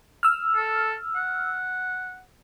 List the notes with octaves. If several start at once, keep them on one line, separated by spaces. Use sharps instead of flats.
E6 F6
A4
F#5